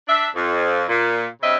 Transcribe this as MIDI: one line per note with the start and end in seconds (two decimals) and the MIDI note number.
0.08 0.27 62
0.08 0.27 76
0.35 0.83 41
0.88 1.25 46
1.42 1.57 43
1.42 1.57 49
1.42 1.57 60
1.42 1.57 75
1.42 1.57 76